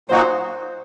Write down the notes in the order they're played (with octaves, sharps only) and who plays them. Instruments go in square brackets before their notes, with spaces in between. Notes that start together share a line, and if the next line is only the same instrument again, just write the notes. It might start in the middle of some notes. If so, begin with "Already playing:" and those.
[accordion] A#2 F#3 A#3 D#4 F#4 [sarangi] C5